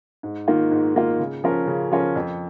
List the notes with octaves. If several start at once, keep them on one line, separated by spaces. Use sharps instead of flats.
G#2
D#3 A#3 F4
G#2
D#3 A#3 F4
C#3
F3 C#4 F4 A#4
C#3
F3 C#4 F4 A#4
F2